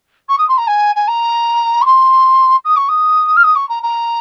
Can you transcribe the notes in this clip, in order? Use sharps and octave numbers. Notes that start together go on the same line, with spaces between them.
C#6
D#6
C6
A#5
G#5
G#5
A#5
C#6
C6
D#6
C#6
D#6
F6
D#6
C#6
A#5
A#5